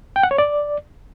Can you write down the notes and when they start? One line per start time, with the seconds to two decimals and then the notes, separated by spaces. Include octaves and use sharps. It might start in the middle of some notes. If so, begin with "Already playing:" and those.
0.16 G5
0.23 F#5
0.31 C#5
0.38 D5